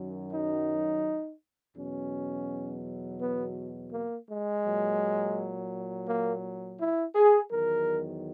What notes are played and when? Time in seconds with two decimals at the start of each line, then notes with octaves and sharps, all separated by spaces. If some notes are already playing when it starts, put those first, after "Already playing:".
Already playing: F#2 D#3 F#3
0.33 D#4
1.76 E2 B2 F#3 C#4
3.20 B3
3.91 A#3
4.28 G#3
4.65 A#2 F#3
6.08 A#3
6.79 E4
7.15 G#4
7.51 E2 D#3 F#3 A#4